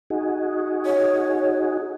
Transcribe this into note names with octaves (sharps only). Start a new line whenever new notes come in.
D#4 F#4 G#4
C#5